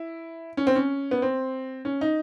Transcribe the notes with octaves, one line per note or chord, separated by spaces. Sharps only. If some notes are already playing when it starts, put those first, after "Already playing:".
Already playing: E4
C#4
C4
C#4
B3
C4
C#4
D#4